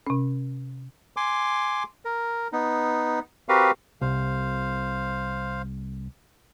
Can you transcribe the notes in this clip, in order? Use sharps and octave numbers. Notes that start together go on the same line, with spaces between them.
C3 C#4
G#5 C6 D6
A#4
B3 D#4
C4 F#4 G4 A#4 B4 F5
C2 C5 F5